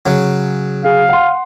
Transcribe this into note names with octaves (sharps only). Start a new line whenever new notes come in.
C#3 F#3
G#4 F5
F#5 C6